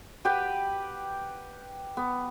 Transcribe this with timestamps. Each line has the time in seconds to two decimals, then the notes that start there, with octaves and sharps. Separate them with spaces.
0.25 G4 B4 F#5 G5
1.97 B3